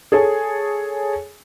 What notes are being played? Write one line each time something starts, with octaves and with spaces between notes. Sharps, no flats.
G#4 A4 C#5 G#5